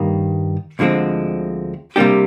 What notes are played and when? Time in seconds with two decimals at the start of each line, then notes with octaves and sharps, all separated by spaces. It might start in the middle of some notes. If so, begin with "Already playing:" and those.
Already playing: G2 D#3 G3 A#3
0.79 D2 D3 F3 G#3 C4
1.96 C3 G3 A#3 D4 G4